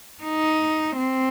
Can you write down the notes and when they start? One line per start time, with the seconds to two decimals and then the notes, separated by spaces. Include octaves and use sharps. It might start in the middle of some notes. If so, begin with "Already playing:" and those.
0.23 D#4
0.96 C4